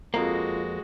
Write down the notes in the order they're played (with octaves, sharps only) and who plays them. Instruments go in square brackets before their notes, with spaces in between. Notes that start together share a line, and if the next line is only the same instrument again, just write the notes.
[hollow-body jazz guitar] F2 A#3 [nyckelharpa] G#3 F#4 [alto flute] F4